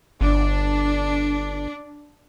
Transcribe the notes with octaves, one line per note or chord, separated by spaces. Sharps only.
G1 D4